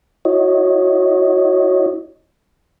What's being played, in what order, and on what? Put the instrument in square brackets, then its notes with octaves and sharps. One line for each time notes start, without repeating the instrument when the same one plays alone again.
[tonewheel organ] E4 F#4 C#5 D#5